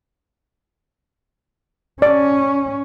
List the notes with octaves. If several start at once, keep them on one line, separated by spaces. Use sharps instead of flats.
C#4 D5